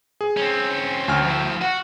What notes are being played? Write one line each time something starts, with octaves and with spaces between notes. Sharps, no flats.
G#4
C4 C#4
D2 G#5 F6
F3 E4
F#4 F#5